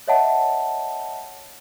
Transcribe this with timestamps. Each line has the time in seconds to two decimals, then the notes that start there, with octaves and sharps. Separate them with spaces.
0.07 C#5 D#5 E5 F#5 A5